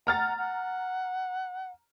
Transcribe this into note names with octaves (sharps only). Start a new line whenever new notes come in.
F#5 A#5 F6 A6
F#5